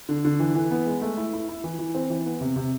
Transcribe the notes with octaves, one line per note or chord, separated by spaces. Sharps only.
D3
D3
E3
E3
B3
G#3
A3
E4
E4
E4
E3
E3
C4
E3
B3
C3
C3